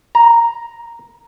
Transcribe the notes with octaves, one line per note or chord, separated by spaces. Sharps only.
A#5